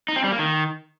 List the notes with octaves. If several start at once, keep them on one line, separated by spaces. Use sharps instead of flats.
D#4
C4
G3
A#3
D#3